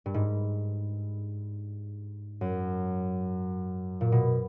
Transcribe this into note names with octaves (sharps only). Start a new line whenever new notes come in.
G2
G#2
F#2
A#2
B2